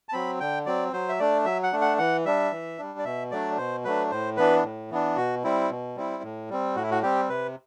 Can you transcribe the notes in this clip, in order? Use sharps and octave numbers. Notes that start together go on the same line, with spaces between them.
A5
F#3 C4 B5
D3 G5
F#3 C4 D5
F#3 C5
E5
A3 D4 D5
F#3 E5
F#5
A3 D4
F#5
E3 F#5
G3 D4 E5
E3
G3 D4
D5
B2 E5
F#3 A3 D4 D5
B2 C5
F#3 A3 D4 B4
A2 C5
E3 B3 D4 B4
A2
E3 B3 D4
B2 F#4
G3 C4 E4
B2
G3 C4 E4
A2
G3 C4
A2 F#4
E4
F#4
G3 C4 G4
C3 B4